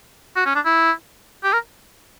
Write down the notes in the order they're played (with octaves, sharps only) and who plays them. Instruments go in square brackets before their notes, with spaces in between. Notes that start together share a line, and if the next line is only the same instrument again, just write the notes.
[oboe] F#4
C#4
D4
E4
G4
A#4